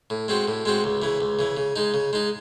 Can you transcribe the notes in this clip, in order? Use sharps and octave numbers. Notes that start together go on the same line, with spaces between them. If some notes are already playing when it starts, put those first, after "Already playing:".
A2
G#3 C4 F#4
A2
G#3 C4 F#4
C#2
C#3 E3
C#2
C#3 E3
C#3
G#3 D#4
C#3
G#3 D#4